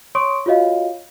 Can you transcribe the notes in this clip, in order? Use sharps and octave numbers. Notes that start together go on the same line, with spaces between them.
C#5 C6 C#6 D#6 D7
F4 F#4 C#5 D#5 F5